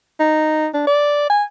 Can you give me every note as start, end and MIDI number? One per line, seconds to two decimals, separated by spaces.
0.20 0.68 63
0.74 0.82 62
0.87 1.26 74
1.30 1.44 80